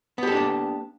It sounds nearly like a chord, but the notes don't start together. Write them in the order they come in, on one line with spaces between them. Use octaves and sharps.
B3 G4 A4 D4 A#3